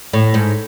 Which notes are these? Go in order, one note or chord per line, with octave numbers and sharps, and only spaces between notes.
A2
G#2